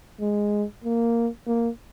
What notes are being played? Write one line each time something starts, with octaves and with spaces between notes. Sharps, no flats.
G#3
A#3
A#3